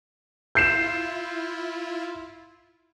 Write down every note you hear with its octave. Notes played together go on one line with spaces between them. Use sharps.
E4 F4 G6 C7 E7